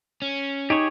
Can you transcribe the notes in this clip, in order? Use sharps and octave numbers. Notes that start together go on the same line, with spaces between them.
C#4
D#4 G4 G#4 C#5